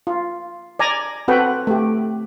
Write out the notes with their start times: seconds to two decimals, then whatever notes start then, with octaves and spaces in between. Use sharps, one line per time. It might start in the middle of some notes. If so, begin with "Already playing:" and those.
0.07 F4
0.79 D5 G#5 A#5
1.28 C4 F#4 A4 B4 F#5 G5
1.67 A3 G4